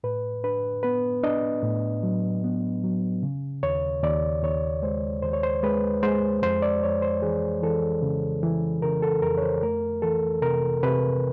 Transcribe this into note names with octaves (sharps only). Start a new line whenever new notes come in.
A2 B4
D4 B4
B3 B4
D4 D#5
A2
F#3
B3
F#3
C#3
D#2 C#5
D#2 D5
D#2 C#5
G#3 C5
D#2 C5
C#5
C5
G#3 B4
G#3 C5
F2 C5
D5
F2 C#5
C5
E3 G#4
E3 A4
C#3
E3
C#3 A#4
A4
F2 A#4
C#5
C5
A3 A#4
E3 A4
C3 A#4
C3 B4